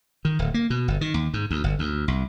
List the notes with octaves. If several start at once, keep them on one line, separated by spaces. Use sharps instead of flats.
D#3
D1
A#3
B2
G1
D#3
D#2
G#2
D2
G1
D2
C2